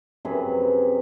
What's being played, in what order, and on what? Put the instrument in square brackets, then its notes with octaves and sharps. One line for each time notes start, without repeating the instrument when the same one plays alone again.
[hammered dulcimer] F#2 C3 G#4 B4